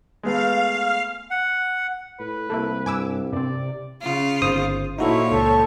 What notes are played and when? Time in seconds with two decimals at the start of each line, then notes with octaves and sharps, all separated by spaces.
0.23 G#3 A3 B3 F5
1.31 F#5
2.19 A2 B4
2.50 C2 A3 A#3 E4
2.86 G2 G#5 D6 E6
3.32 G2 C3 C4 D5
4.02 C#3 F4
4.42 G1 C5 D#6
4.99 A#2 F3 D#4 E4 F#4 A4 C#5
5.31 C#2 A4